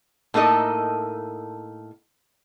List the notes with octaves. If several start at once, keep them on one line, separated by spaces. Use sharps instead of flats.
A2 A#3 D#4 A4 D#5